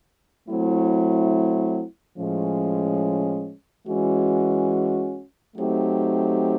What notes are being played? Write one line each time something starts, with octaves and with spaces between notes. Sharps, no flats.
F#3 A3 C4 E4
A2 F3 G#3 C#4
E3 G#3 C#4 F#4
F#3 A3 C4 D#4 G4